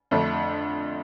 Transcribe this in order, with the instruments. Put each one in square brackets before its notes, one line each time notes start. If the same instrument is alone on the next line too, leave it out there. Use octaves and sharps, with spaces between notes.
[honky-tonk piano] F2 D3 A3 D4